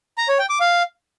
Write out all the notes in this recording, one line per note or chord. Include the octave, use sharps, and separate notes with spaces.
A#5
C#5
G5
D6
F5